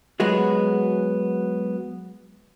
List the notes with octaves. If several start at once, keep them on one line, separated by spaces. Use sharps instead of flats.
F#3 G#3 B3 F#4